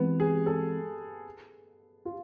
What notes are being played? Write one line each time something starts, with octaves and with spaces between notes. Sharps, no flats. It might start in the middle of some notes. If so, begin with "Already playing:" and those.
Already playing: E3 G#3 B3 C4
G#4
A4
F4